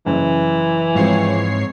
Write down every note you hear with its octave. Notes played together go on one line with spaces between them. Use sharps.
F#1 E3
G#2 F3 G#3 C4 C#5 C7